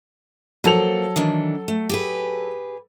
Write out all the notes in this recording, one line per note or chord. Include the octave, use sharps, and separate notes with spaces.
F3 F#3 A#3 A4 F7
D#3 E3 D4
A3
G4 G#4 B4